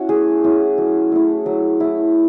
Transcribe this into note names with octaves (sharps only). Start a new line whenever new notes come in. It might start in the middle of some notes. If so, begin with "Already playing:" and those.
Already playing: C#4 E4 F#4
A3 G#4
C#4 E4
F#3
A3 E4
F#3
A3 E4